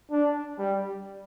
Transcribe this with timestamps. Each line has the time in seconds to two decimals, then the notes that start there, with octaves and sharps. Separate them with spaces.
0.11 D4
0.58 G3